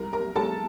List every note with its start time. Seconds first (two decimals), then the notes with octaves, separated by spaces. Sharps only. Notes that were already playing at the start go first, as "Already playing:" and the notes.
Already playing: C2 G#3 A#4 A#5
0.13 A#4 A#5
0.36 G#3 A4 A5